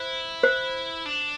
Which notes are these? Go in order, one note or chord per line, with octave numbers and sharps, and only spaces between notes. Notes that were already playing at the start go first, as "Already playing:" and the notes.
Already playing: E4 C5
C5
D4